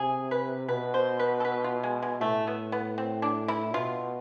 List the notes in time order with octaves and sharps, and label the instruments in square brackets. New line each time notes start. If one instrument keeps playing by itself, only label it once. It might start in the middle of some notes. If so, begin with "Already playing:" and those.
Already playing: [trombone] C3 [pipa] G#4
[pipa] B4
[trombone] B2 [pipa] B4
[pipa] C5
B4
A4
B4
F4
G#3
G#3
[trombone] A2 [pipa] A3
[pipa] B3
B3
C4
D4
E4
[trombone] B2 [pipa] F4